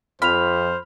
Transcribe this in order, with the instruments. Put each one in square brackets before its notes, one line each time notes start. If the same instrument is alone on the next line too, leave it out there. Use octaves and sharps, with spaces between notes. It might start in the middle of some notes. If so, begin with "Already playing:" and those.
[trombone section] F2 [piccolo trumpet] C5 [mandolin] B5 [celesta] F6 F7